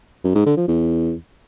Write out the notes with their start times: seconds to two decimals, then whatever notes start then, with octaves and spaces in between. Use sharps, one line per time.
0.24 F#2
0.35 G#2
0.46 D3
0.57 F3
0.68 E2